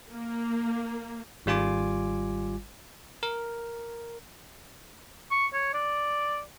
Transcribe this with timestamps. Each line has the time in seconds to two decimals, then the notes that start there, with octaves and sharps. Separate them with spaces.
0.10 A#3
1.46 G#1 G3 F4 G#5 D6
3.23 A#4
5.31 C#6
5.53 C#5
5.74 D5